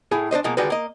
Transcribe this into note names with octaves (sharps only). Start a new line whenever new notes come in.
A2 E4 G#4
D4 B4 C5 D#5
B2 F3 G#3 A#3
D3 D#3 G3 G#3 F#4 B4
A#3 D#5